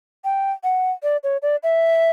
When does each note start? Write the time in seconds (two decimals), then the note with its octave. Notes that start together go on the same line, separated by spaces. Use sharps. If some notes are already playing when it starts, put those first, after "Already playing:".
0.24 G5
0.64 F#5
1.03 D5
1.24 C#5
1.42 D5
1.63 E5